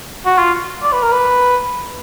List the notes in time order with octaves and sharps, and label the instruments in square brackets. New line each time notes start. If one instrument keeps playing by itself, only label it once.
[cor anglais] F#4
F4
D5
B4
A#4
B4